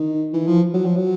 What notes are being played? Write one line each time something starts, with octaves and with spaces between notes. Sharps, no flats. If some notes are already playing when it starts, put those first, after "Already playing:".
Already playing: D#3
E3
F3
F#3
F3
F#3